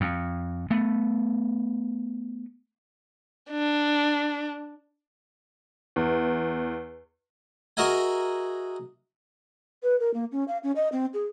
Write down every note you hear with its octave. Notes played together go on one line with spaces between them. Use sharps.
F2
A3 B3
D4
E2
F#4 G#4 A#4 D#5 E5 G#5
B4
A#4
A#3
C#4
F5
C#4
D#5
C4
G#4